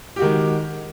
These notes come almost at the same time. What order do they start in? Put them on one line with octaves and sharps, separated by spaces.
G4 F#4 D#3 G#3